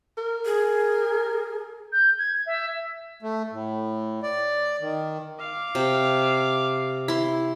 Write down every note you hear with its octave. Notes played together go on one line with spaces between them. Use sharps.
A#4
G#4
G6
G#6
E5
A3
A2
D5
D#3
F5 D6
C3
E4 C6